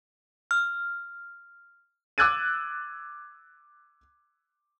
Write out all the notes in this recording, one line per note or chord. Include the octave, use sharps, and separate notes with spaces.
F6
D6 E6 F#6 G#6 A6 D#7